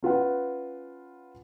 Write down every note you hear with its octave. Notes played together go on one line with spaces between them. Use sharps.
C#4 F4 B4 F#5